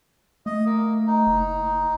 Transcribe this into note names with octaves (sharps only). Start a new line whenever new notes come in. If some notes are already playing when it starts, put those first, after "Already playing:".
A3 D#5
A#3
D#4
F#1